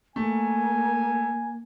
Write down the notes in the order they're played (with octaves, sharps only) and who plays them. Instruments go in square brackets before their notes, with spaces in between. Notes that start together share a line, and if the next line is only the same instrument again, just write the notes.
[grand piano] A3 [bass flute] A#3 [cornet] G#5